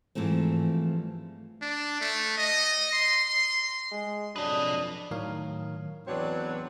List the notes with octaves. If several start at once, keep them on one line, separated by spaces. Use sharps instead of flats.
G#2 E3 F3 G3 A3 C4
D4
A3
D#5
C6
C6
G#3
F2 F#3 D4 B4 D#5 D#6
A2 D#3 F#3 A#4 C#5 F5
E2 F#3 C4 D4 B4 C#5